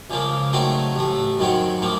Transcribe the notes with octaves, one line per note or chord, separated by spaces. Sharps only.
C#2 C#3 F3 A#3
C#3 F#3 A3 C4 D#4
A1 A2 A3
F#2 D#3 F#3 C4 F#4
A2 F3 A#3